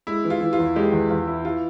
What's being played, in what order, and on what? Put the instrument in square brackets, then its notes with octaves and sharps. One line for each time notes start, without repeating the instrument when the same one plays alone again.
[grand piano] G#3 [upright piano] E4
[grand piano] E3
[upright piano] F4
[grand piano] E3
[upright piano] F4
[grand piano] E2
[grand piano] G#3 [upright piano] G4
[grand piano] E2
[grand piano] E2 [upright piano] F4
[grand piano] E4
[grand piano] E3 [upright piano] F4